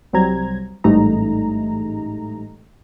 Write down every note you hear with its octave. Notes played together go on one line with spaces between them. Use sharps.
C2 F#3 G3 C4 A#5 G#6
A1 G#2 G3 A3 D#4 A#5